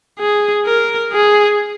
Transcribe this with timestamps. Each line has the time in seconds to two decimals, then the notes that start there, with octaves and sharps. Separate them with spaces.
0.19 G#4
0.65 A#4
1.13 G#4